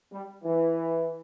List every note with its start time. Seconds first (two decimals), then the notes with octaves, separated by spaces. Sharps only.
0.13 G3
0.44 E3